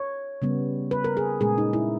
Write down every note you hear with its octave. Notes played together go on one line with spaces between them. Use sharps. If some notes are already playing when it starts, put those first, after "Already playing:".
Already playing: C#5
C#3 G3 B3
B4
A#4
G#4
A#2 G#3 C#4 G#4
D#4
E4